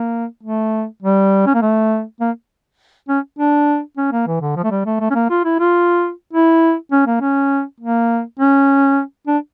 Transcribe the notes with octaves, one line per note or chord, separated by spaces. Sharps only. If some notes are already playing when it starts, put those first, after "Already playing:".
Already playing: A#3
A3
G3
C#4
A#3
A3
A#3
C#4
D4
C#4
A#3
E3
D3
F3
A3
G3
A3
A3
C#4
A#3
F4
E4
F4
E4
C#4
A#3
C#4
A#3
C#4
D4